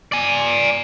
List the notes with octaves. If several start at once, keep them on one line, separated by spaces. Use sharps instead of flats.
D5 G#5